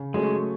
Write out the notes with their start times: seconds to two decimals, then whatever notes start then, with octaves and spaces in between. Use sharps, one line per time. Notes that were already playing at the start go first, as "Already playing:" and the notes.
Already playing: C#3
0.14 F#3 G#3 A3 C#4 G#4